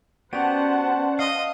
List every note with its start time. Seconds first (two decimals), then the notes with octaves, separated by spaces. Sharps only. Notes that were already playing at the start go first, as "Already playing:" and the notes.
0.33 B3 C#4 F#4 G4 C5 D5 F#5 A5
1.19 D#5 F5